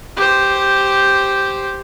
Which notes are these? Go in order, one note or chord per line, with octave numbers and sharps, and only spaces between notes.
G4 C5